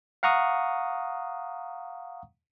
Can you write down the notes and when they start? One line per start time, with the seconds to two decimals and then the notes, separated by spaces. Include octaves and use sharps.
0.23 F5 F#5 A#5 C#6 D#6